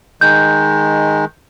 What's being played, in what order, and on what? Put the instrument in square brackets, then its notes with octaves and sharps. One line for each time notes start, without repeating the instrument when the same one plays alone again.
[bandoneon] D#3 G#3 [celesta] G6